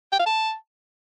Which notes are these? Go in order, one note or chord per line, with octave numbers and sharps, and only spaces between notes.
G5
F5
A5